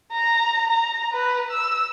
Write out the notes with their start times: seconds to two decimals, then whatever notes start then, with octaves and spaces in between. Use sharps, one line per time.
0.13 A#5
0.70 A#5
1.13 B4
1.51 E6